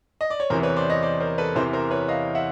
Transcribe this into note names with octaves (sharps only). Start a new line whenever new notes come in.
D#5
D5
C#5
E2 C3 E3 A#4 C5
B4 C#5
C5 D5
C#5 D#5
C5 D5
A#4 C5
A4 B4
E2 C3 E3 A#4 C5
A#4 C5
B4 C#5
D#5 F5
E5 F#5